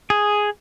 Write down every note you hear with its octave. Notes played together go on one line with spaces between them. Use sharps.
G#4